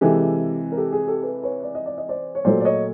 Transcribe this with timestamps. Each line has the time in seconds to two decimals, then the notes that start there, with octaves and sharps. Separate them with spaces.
0.01 C3 E3 G#3 G4 A4
0.72 A#4
0.77 G4 A4
0.93 G#4
1.07 G4 A4
1.23 A4 B4
1.43 B4 C#5
1.63 D5
1.75 D#5
1.86 D5
1.98 D#5
2.09 C5 D5
2.35 C#5
2.44 A#2 F#3 A3 C5 D5
2.60 D5
2.65 C#5 D#5